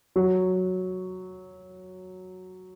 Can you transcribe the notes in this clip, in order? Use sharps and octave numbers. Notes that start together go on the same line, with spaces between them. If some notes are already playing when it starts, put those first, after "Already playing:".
F#3